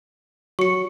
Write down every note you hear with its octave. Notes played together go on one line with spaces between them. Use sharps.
F#3 C#6 C#7